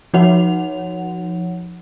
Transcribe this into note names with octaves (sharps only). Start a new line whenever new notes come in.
F3 D#4 F#4 C#5 F#5 F7